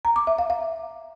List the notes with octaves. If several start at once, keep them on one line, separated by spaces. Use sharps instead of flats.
A#5
D6
E5
F5
F5